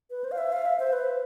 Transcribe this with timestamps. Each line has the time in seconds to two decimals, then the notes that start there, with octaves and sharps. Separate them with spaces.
0.11 B4
0.24 C5
0.32 F5
0.38 E5
0.52 F5
0.66 E5
0.80 C5
0.93 B4